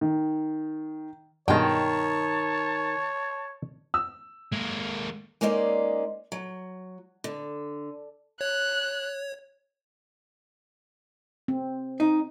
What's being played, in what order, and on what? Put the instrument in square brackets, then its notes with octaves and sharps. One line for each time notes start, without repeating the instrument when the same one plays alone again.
[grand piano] D#3
[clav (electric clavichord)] G2 B2 G#3 [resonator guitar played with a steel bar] D#3 G5 [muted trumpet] C#5 [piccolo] A5
[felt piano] E6
[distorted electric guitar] G#3 A#3
[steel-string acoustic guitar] G#3 A#3 C#4 D#4 C5 D5
F#3
D3
[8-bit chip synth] C#5 [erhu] F#6
[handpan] C4
[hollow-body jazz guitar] D#4